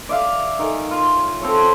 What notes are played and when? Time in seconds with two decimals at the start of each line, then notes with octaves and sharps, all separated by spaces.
0.09 D5 E5 F5
0.59 D#3 G#5
0.91 F4
1.17 C#5
1.42 C4 A4 C#5